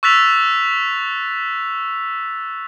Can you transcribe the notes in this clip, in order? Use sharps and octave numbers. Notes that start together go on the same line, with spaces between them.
C#6 E6 F#6 A6 B6 F7